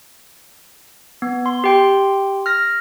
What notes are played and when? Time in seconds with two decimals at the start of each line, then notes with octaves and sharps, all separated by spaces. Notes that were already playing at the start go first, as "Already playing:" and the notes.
1.22 B3
1.46 C6
1.64 G4 G5 C6
2.46 F6 A#6